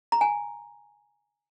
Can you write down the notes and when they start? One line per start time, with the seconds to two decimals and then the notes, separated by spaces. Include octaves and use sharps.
0.12 A#5
0.21 G#5